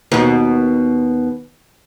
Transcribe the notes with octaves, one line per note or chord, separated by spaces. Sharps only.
D#2 B2